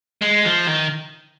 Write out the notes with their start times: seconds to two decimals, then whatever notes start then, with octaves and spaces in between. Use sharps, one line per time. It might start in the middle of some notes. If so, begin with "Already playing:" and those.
0.22 G#3
0.46 F3
0.67 D#3